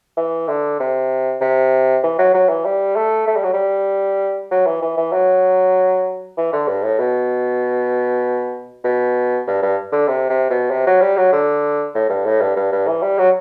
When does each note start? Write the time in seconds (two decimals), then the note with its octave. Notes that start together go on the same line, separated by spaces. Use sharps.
0.17 E3
0.48 D3
0.80 C3
1.41 C3
2.04 E3
2.18 F#3
2.34 F#3
2.49 E3
2.65 G3
2.96 A3
3.27 A3
3.36 G3
3.44 F#3
3.53 G3
4.51 F#3
4.67 E3
4.82 E3
4.97 E3
5.12 F#3
6.37 E3
6.53 D3
6.68 G2
6.83 A2
6.99 B2
8.84 B2
9.47 G2
9.62 G2
9.93 D3
10.08 C3
10.30 C3
10.50 B2
10.71 C3
10.87 F#3
11.02 G3
11.17 F#3
11.32 D3
11.95 A2
12.09 G2
12.26 A2
12.41 G2
12.56 G2
12.72 G2
12.87 E3
13.02 G3
13.18 F#3